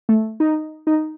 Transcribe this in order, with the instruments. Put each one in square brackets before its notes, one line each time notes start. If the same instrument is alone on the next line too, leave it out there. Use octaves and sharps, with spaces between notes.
[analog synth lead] A3
D#4
D#4